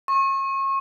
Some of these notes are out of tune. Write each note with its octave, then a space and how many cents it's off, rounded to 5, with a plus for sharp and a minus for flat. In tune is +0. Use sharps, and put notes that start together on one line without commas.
C#6 -35